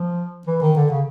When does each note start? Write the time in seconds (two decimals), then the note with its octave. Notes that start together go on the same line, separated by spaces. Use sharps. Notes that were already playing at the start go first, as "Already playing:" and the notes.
Already playing: F3
0.47 E3
0.62 D#3
0.76 D3
0.91 C#3